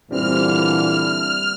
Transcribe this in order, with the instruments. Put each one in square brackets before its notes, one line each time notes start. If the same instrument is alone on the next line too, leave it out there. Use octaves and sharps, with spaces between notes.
[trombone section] A#2 D3 E3 [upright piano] G3 C4 [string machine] F6